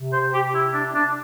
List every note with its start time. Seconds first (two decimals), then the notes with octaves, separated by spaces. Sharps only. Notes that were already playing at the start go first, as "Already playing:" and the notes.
Already playing: C3
0.13 C5
0.34 G4
0.54 E4
0.74 D4
0.95 D4